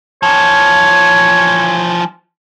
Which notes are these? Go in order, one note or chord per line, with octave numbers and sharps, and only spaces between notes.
E3 F3 C#5